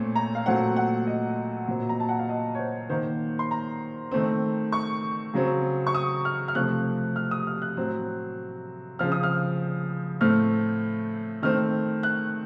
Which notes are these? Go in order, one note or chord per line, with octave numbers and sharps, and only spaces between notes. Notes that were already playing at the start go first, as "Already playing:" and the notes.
Already playing: A#2 A3 C4 C#5
A#5
F5
A#2 F#3 A3 C4 F#5
F#5
D#5
A#2 F#3 C4
A#5
A5
F#5
F5
D#5
C#5
C5
D#3 A#3 C5
C6
A#5
D#3 A3 C4
C#6
C#3 F#3 C4
C#6
D#6
F6
F6
C3 F3 A3 C4 F#6
F6
D#6
F6
F#6
A2 F#3 C4
C#3 F3 C4 F6
D#6
F6
A2 A3 C4 F6
D#3 A3 C4 F6
F#6